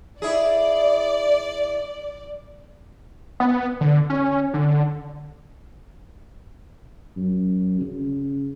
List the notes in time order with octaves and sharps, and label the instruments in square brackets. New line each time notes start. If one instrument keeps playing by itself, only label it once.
[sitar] E4 G#4 [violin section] D5
[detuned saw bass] B3
D3
C#4
D3
[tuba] F#2
C#3